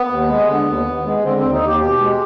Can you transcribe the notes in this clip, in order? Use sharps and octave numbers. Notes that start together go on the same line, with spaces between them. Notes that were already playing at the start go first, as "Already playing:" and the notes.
Already playing: B3
D#2
G#3
D3
D#2
D#2
G#3
D3 C4
C4
D#2
D#4
D#2 G4
B2 G4
G#3